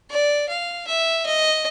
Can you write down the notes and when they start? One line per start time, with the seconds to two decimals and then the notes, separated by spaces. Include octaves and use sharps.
0.10 D5
0.49 F5
0.87 E5
1.26 D#5